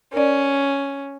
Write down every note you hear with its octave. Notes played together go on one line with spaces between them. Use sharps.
C#4 A#4 D5